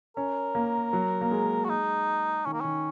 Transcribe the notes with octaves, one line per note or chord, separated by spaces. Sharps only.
C#4 A#4
A#3
F#3
A#3
G#3
F#4
D#4
D#3 C#4
A#3
D#3 C#4